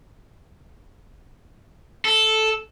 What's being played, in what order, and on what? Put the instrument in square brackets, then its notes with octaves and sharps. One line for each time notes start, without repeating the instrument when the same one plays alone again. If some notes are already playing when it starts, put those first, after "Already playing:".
[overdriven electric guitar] A4